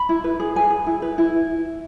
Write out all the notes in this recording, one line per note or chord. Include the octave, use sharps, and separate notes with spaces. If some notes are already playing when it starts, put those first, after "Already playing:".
Already playing: B5
E4
B4
G#4
G#4 G#5
G#4
E4
B4
E4